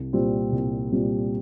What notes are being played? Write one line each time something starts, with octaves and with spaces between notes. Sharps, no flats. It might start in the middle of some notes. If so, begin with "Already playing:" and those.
Already playing: C2
A#2 G3 C4
C2
A#2 G3 C4